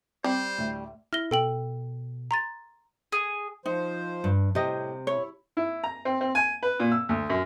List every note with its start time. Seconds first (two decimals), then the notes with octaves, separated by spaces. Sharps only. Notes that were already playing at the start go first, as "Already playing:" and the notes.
0.24 G3 C4 C5
0.58 D2 A2
1.13 E4 F6 A#6 G7
1.31 B2 A4 G5 F#7
2.31 A#5 C6 A6
3.12 G#4
3.66 F3 D#4 C5
4.24 G2
4.55 A2 C3 G4 D#5
5.07 E4 C#5
5.57 E4
5.84 A#5
6.05 C4
6.21 C4
6.35 G#5
6.63 B4
6.80 A#2
6.92 E6
7.09 D2
7.30 F#2